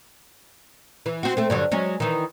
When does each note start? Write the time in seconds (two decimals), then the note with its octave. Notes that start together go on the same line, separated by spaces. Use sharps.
1.06 E3
1.23 C4 F#4
1.37 A3 C4
1.50 G2 D3 F#3
1.72 F#3 G#3 C#4
2.00 D#3 E3